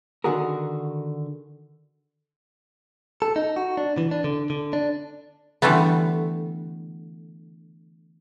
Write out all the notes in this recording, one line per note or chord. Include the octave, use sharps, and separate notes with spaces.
D3 D#3 F#4 G#4 A#4
A4
D#4
F#4
D4
E3
D4
D3
D3
D4
D3 E3 G3 A3 B3